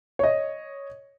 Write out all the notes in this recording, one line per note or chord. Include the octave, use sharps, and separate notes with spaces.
C#5 D#5